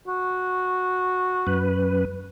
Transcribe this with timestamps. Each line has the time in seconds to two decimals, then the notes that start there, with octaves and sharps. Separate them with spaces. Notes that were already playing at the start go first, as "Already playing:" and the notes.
0.08 F#4
1.47 F#2 B4